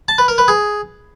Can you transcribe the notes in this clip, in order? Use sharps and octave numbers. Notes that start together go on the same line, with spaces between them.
A5
B4
A#4
B4
G#4